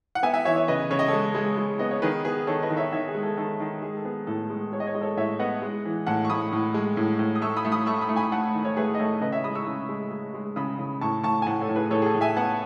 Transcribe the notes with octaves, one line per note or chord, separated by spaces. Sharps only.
F#5
B3 E5 G#5
E5 G#5
E3 C#5 E5
C#5 E5
C#3 B4 D#5
C#3 C#5
D#5
G#3 A4 C#5
G#3
G#3
B3 D#5
C#5
D#3 G#4 B4
B3 G#4 B4
D#3 A4 C#5
B4 D#5
D#3
C#5 E5
D#3 C#5 E5
G#4
G#3
A4
D#3 A4
D#3
G#3 G#4
A4
B3 G#4
A2 A4
G#3
G#3 C#5
D#5
C#5
G#3 D#5
A4 C#5
A2 C#5 E5
B3 D#5 F#5
G#3
E3
A2 F#5 A5
C#6
A2 B5 D#6
A2
G#3
A2
A2
D#6
A3 C#6 E6
B5 D#6
A3
B5 D#6
A3 C#6 E6
B5 D#6
A3
G#5 B5
A3 F#5 A5
D#3
C#5
A3 G#4 B4
D#5
A3 A4 C#5
C#3 B4 D#5
C#5 E5
G#3 B5 D#6
C#6 E6
C#3
G#3
G#3
G#3
C#3 B5 D#6
C#3
A2 A5 C#6
A2 A5 C#6
G#5
A2 F#5 A5
A4 C#5
A2
G#4 B4
A2 A4 C#5
G#4
A4
A2
E5 G#5
B3 F#5 A5